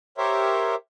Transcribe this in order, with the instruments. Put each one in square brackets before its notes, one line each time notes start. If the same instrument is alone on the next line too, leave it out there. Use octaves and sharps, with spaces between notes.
[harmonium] G4 A#4 C5 C#5 E5